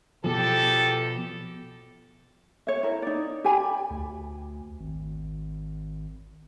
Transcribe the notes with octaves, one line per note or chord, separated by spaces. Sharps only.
E2 B2 F3 G4 A4
C#5 E5
E4 A#4
D#4 D5
G4 G#5 A5 B5
D2
G#1